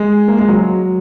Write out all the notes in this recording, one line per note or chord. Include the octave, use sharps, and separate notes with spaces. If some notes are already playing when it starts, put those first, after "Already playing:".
Already playing: G#3
A#3
G#3
F#3